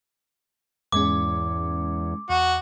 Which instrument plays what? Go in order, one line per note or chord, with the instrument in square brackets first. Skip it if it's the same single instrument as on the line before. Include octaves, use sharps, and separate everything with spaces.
[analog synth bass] E2 [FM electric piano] G#2 G#3 C#4 [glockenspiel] D6
[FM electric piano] E2 [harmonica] F#4